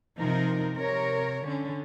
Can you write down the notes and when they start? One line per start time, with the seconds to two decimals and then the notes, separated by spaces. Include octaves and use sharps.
0.20 C3 F3 D#4 A#4
0.76 C3 A#4 C#5
1.44 D3 C#4